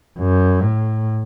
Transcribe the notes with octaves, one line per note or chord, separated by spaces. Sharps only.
F#2
A2